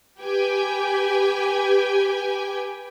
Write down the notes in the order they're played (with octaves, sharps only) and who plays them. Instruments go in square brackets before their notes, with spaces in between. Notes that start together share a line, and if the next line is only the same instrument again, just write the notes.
[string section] G4 B4 G5 G#5